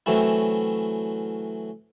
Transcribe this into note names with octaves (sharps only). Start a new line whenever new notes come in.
E3 F#3 A3 C4 C#4 E4